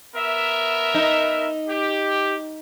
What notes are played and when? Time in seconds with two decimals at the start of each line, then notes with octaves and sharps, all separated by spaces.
0.14 B3 A#4 E5
0.94 D#4
1.68 G4